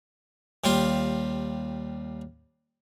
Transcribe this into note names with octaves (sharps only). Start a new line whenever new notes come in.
D#2 G3 F4 C6